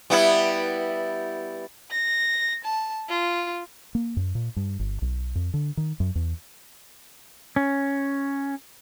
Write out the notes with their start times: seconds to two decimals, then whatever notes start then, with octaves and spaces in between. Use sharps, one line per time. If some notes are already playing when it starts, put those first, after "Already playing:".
0.10 G3 B3 E4
1.91 A#6
2.64 A5
3.09 F4
3.95 A#3
4.17 F#2
4.35 A#2
4.56 G2
4.79 G1
5.02 B1
5.35 F2
5.54 D3
5.77 D#3
6.00 F#2
6.15 E2
7.56 C#4